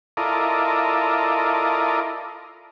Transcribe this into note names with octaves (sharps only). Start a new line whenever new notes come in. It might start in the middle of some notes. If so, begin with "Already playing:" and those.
E4 F4 A4 A#4 D5 D#5